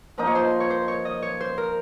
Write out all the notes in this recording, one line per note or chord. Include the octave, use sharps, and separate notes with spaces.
F3 A#3 D#4 D#5
C#5
C5
C#5
C5
C#5
D#5
C#5
C5
A#4